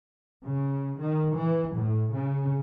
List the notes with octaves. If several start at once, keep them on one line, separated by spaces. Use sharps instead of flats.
C#3
D#3
E3
A2
C#3